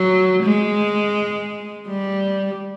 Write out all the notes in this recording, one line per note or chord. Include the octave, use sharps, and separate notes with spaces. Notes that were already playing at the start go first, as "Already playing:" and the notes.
Already playing: F#3
G#3
G3